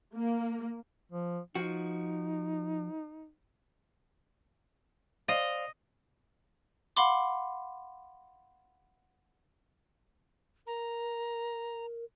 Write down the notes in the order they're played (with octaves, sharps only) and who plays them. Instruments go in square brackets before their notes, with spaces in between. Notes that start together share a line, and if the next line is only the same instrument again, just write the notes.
[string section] A#3
[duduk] F3
[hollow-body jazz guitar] F3 F#4 [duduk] D#4
[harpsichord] C5 D5 F5 [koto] D#5
[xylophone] F5 F#5 B5 C6 D6
[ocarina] A#4 [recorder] A#5